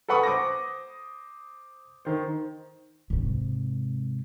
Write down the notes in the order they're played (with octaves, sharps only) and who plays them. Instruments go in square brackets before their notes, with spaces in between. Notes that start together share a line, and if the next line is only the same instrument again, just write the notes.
[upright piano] A4 B4 F#5 B5 C#6 D#6
C5 D6 D#6 A#6
D#3 C5
[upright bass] G#2 C3